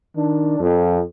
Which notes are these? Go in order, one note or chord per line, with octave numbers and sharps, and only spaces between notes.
D#3 D4
F2